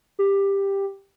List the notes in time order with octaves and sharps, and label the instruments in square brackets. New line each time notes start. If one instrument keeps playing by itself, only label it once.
[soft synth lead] G4